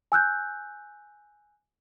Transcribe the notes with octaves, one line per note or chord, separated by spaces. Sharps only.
G#5 E6 F#6 G6